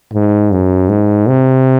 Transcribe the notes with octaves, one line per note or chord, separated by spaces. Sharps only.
G#2
F#2
G#2
C3